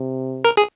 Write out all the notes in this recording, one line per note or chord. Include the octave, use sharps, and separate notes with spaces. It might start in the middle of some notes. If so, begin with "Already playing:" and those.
Already playing: C3
A#4
G#4